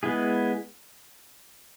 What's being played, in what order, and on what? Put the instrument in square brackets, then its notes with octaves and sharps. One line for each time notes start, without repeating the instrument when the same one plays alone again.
[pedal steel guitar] G#3 B3 E4 G#4